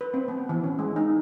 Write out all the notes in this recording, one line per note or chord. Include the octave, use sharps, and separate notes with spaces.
B4
C4
B3
E3
C#4
G#3
D#4